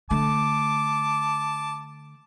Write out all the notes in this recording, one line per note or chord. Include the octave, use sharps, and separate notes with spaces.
D3 A3 A5 D6